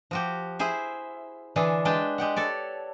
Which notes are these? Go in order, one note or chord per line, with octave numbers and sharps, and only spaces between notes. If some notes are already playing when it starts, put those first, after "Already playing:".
F3 F#4 G4
E4 G#4 C5
D3 E3 D4 G#4 A4
G#3 D4 B4 G5 A5
G#3 G4 F#5
A4 C#5 D5